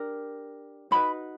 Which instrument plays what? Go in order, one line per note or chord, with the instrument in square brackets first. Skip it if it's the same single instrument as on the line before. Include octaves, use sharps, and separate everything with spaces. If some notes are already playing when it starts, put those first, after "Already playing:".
Already playing: [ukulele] D4 G4 A#4
D#4 F#4 B4 B5